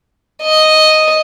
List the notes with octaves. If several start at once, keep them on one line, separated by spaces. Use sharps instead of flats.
D#5